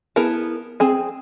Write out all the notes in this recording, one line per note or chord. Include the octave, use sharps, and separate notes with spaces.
B3 E4 G#4 A#4 A5
C4 G#4 G#5